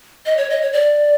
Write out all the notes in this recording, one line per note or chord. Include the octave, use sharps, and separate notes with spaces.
D#5
C#5
D#5
C#5
D5